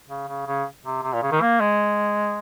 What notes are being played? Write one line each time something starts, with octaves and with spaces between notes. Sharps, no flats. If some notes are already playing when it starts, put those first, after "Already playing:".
C#3
C#3
C#3
C3
C3
A#2
C#3
D#3
A#3
G#3